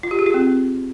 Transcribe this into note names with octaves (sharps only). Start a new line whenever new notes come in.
F4
G4
G#4
F4
C4